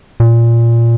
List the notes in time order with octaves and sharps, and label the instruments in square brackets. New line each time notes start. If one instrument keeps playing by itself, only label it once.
[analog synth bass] A#2